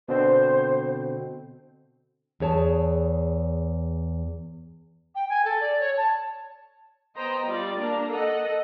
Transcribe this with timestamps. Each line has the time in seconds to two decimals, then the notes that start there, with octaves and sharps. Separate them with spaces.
0.09 B2 D3 C4 C5
2.40 E2 G#4 C#5 A5
5.15 G5
5.29 G#5
5.45 A4
5.61 D5
5.80 C#5
5.97 A5
7.16 B3 C5 D#5 G5 A#5
7.45 G3 F4 D5
7.77 A#3 D4 A#5
8.10 A4 D#5 F#5